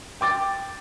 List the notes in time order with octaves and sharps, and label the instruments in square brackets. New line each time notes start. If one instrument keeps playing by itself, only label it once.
[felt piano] G5 D6 A6